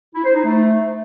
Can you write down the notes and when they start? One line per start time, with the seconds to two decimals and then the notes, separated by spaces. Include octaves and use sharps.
0.15 E4
0.25 C5
0.34 D#4
0.44 A3